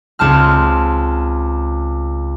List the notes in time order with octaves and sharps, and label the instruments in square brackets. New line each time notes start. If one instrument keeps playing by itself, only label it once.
[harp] C#2 C4 A5 F6